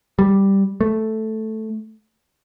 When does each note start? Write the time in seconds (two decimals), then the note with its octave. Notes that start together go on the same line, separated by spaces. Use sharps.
0.19 G3
0.81 A3